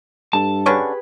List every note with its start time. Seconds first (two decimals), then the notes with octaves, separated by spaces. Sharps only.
0.33 G2 A4 A5
0.66 D3 C#4 G4 G#4 B4 C#6